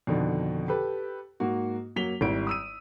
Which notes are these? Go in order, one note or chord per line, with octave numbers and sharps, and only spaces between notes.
F2 B2 D3 D#3
G4 A4 B4
G#2 A#3 F#4
F#2 F#3 A#3 B6 F7 G7
G#1 G3 E4 D7
D#6 E6 D#7